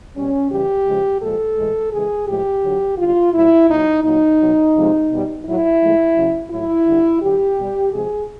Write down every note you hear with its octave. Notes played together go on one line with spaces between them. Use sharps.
B2 G3 C#4
C#3 E3 G3 G4
C#3 F3 G#3
A#2 F3 G#3 A4
A2 E3 G#3
C#3 E3 G#3 G#4
A2 F3 G#3 G4
D3 F#3
D3 G3 F4
A2 F#3 E4
A#2 F#3 D#4
A#2 F#3 D#4
B2 F#3
C3 F3 G#3
B2 G3
A2 F#3 E4
A2 F3 G#3
C#3 F#3
A2 F#3 E4
D3 G3
D3 F#3 G4
B2 G3
C3 F3 G#3 G#4